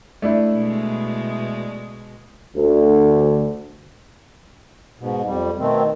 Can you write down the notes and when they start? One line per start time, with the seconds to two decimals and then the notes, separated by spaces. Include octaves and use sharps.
0.22 A3 D4 E4
0.53 B2 G#3
2.54 D2
5.00 G#2 B2
5.26 F2 G3
5.59 B2 D#3 A3 C4